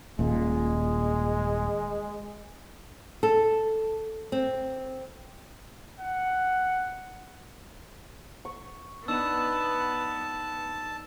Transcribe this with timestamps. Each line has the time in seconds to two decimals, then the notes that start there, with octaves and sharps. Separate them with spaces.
0.19 D#1 A#2 G#3
3.23 A4
4.32 C4
6.00 F#5
8.45 C#6
9.08 B3 D4 D#4 A5 E6 E7